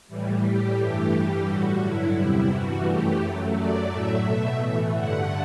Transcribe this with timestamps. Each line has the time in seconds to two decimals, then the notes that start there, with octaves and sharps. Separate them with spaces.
0.08 A2 E3 G3
0.43 A2 G3 G4
0.78 G2 E3 A3 G4
1.12 G2 E3 G3 G4
1.46 A2 G3 F#4
1.81 G2 D3 F#3 E4
2.17 E2 C3 G3
2.51 G2 E3 G3 F#4
2.86 F#2 E3 A3 G4
3.19 F#2 F#3 A3
3.54 F#2 F#3 A3 D5
3.89 A2 F#3 A3 E5
4.24 B2 A3
4.58 A2 E3 A3
4.93 G2 D3 A3 F#5